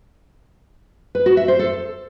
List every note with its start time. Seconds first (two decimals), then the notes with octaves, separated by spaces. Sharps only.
1.15 B4
1.26 F#4
1.37 E5
1.48 C5
1.59 A4